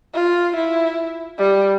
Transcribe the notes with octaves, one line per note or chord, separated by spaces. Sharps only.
F4
E4
G3